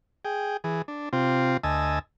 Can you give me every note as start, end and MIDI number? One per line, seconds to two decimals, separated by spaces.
0.25 0.57 68
0.25 0.57 79
0.64 0.82 52
0.64 0.82 68
0.88 1.09 62
1.13 1.57 48
1.13 1.57 60
1.13 1.57 65
1.63 1.99 38
1.63 1.99 75
1.63 1.99 80
1.63 1.99 81
1.63 1.99 88